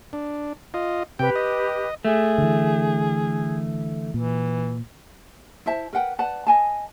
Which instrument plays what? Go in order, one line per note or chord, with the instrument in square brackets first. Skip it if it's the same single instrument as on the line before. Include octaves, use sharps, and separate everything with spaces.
[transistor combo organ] D4
F4 D#5
[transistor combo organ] C3 G5 [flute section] G4 B4
[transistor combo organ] D#5
[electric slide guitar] A3 [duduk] G#4
[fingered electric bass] D3 E3
[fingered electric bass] A#2 [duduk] E3
[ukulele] E4 C5 E5 A5
A#4 B4 F#5 G5
B4 D5 F#5 A5
D#5 G#5 A5